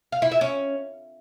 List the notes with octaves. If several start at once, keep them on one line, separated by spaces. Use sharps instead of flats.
F5
E4
E5
C#4